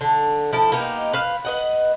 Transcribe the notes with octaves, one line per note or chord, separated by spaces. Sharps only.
D3
F3 E4 A4
A#3 B3 D#4 G4
B4 C5 F5
B4 D#5 F#5